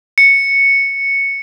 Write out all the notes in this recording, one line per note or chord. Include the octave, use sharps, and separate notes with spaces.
C#7